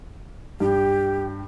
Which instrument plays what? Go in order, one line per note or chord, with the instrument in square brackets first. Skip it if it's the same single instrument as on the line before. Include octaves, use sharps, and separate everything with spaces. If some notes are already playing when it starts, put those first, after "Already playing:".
[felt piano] G2 [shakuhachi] G4